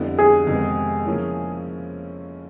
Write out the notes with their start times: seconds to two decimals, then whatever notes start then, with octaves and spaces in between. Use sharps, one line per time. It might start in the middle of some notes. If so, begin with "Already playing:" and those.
Already playing: F2 D3 G3 B3 E4
0.19 G#4
0.47 F2 C3 D#3 G#3 B3
1.06 C#3 F3 A#3 C#4 E4